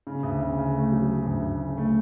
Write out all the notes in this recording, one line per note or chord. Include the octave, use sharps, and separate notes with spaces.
C#3
D2
C#3
C#3
A3
F#3
F#3
D2
D2
C#3
A3